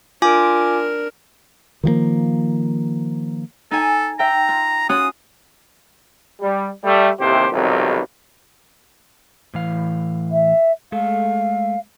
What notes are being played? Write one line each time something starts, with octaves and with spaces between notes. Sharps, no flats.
D4 F4 A#4 G#5 D6
D#3 F3 G#3 A#3
D#4 A4 G#5
E5 G5 A#5
F4
C#4 F4 F#4 D#6
G3
G3 A3
A1 D#2 C3 E3 G4 C5
B1 F2 C3 D#3 F#3 G3
A2 E3 F5
E5
G#3 A3 A4 F5